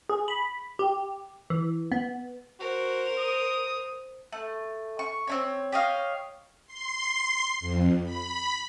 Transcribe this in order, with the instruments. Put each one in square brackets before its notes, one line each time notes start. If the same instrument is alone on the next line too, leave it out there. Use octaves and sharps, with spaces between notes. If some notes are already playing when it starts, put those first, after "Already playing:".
[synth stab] G#4
B5
G4
E3
B3
[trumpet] F#4 [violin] A#4 [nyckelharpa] C5
[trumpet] D#6
[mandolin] A3
C#6
C4 C#4 C#5
G4 C#5 D#5 F5
[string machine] C6 C7
F2
B5